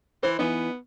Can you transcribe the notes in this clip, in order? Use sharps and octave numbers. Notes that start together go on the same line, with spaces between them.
E3 C5
E3 B3 D#4